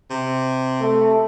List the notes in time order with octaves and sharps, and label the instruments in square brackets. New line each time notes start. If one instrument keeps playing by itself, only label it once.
[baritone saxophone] C3
[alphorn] A3